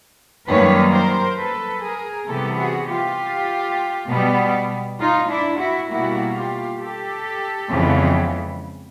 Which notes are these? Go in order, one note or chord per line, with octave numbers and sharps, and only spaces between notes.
F#2 D#3 G3 A#3 B4 C#5
A#4 C5
A4 B4
G#4 A#4
C3 E3 G3 B3 G4 A4
F#4 G#4
F4 G4
B2 G3 B3
D#4 F4
D4 E4
E4 F#4
B2 G3 A#3 E4 F#4
F4 G4
G4 A4
F2 C#3 E3 G#3 B3